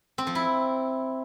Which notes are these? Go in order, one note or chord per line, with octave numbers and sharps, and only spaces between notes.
C4
F3
E4